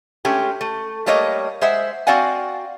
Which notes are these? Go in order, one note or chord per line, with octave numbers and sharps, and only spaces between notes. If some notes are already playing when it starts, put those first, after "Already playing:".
G#3 A3 C#4 G4
A3
G3 A3 A#3 C#5 D#5
G#3 C5 E5 F#5
C4 F#4 D5 F5 F#5 G#5